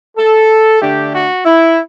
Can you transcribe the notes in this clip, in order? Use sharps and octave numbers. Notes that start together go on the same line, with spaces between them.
A4
D3 A3 D4 G4
F#4
E4